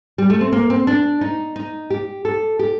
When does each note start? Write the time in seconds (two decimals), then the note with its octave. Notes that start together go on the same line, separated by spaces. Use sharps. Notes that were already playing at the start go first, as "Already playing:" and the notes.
0.18 G3
0.30 A3
0.41 C4
0.52 A#3
0.70 C4
0.87 D4
1.21 D#4
1.56 D#4
1.90 G4
2.25 A4
2.59 G4